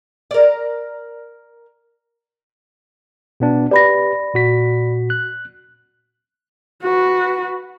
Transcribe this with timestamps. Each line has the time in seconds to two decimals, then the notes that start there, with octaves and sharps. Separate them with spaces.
0.31 A#4 D5
3.40 B2 B3 D4
3.71 G4 B4 D5 B5 A#6
4.34 A#2 F#4 B6
5.10 F#6
6.83 F#4 B4